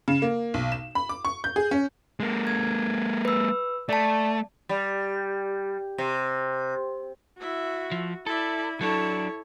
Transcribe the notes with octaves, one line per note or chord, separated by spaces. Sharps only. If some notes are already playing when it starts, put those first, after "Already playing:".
C#3
A#3
B1
E7
B5
D6
C#6
G6
G#4
C#4
G#3 A#3
G#6
B4 E6
A3 D5 A5
G3
C3
E4 F#4 E5
F3
E4 A4 D5 E5
F#3 D4 E4 A4 C#5